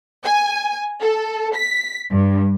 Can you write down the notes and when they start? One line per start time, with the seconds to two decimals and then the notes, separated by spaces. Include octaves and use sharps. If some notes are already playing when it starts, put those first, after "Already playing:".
0.24 G#5
1.01 A4
1.55 B6
2.12 G2